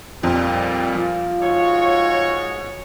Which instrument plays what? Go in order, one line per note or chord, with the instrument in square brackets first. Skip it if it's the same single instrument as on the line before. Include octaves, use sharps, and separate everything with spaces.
[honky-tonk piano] F2 [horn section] A#2 G3
[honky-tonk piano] F3 [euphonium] F4
[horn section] G#2 F#4 C#5